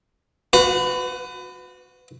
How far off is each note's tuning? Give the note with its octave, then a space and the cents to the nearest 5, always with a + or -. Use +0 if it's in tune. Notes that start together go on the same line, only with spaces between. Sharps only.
F#4 -25 B4 +30